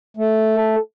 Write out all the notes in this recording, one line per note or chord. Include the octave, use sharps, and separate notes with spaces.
A3
A4